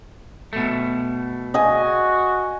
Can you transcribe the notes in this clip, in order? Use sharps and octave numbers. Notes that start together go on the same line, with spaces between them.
B2 A3
F#4 D#5 G#5